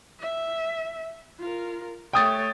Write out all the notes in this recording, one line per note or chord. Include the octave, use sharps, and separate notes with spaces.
E5
F4 A#4
A3 C#5 G5 D#6 A6